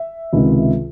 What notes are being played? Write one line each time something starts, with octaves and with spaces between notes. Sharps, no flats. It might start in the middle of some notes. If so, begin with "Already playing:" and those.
Already playing: E5
C#2 C3 D#3